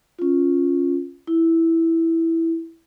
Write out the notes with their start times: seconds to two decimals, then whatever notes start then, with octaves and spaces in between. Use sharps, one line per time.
0.19 C#4 F4
1.27 E4